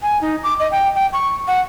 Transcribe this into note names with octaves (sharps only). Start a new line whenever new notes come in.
G#5
D#4
D6
D#5
G5
G5
C#6
F#5